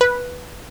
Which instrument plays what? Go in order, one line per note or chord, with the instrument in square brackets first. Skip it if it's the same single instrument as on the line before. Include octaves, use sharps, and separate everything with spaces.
[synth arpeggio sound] B4